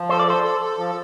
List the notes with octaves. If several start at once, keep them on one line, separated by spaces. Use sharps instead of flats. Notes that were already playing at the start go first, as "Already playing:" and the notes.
Already playing: F3
A4 C5
D5
A4 C5
A4
A4
F3